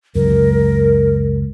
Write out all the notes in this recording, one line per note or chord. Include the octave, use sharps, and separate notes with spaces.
C#2 F#2 A#4